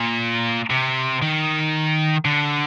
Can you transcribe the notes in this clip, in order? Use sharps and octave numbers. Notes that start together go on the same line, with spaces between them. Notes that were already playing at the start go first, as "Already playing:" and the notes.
Already playing: A#2
C3
D#3
D3